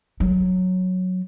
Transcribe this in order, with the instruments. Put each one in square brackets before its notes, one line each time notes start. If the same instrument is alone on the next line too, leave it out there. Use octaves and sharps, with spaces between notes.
[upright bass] F#3